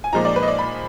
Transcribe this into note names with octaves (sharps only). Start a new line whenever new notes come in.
G#5
A#2 F3 G#3 D#4 A#5
D5
B4
D#5
D5
B5